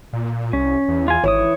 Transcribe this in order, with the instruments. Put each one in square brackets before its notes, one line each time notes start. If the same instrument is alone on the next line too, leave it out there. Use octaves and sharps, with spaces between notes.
[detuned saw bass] A#2
[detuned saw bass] C2 [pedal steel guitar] C#4
[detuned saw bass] E2
[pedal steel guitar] F4 G#5
[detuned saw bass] G#1 [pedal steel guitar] E3 E4 D#6 [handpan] C#5